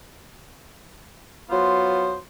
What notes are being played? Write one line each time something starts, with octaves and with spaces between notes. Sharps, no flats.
F#3 B3 F4 C5